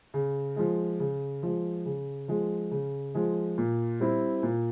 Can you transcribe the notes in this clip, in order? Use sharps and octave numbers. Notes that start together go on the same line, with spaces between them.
C#3
F3 G#3
C#3
F3 G#3
C#3
F3 G#3
C#3
F3 G#3
A#2
G3 C4 E4
A#2